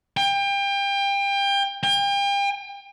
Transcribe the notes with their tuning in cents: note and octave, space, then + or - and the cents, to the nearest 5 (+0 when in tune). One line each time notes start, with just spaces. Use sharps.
G5 +30
G5 +40